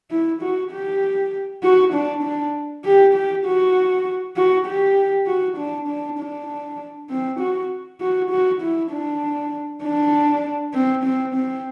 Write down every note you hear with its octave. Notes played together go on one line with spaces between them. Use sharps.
E4
F#4
G4
F#4
D4
D4
G4
G4
F#4
F#4
G4
F#4
D4
D4
D4
C4
F#4
F#4
F#4
E4
D4
D4
C4
C4
C4